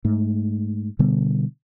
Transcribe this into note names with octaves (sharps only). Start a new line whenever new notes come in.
G#2 A3
B2 D3 G3 B3